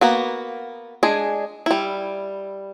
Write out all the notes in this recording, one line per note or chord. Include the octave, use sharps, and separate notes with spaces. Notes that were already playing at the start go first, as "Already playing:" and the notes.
A#3 B3 F#4
G#3 D4 G#4
G3 E4